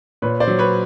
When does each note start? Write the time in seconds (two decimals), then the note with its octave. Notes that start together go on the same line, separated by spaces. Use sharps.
0.22 A#2 B4 C#5
0.40 C5 D5
0.48 F#3
0.59 B4 C#5